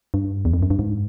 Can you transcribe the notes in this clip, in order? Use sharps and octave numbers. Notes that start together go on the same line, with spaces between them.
G2
E2
F2
F#2
G2
G#2